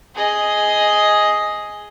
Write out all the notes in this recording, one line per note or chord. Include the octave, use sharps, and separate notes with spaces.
G#4 D#5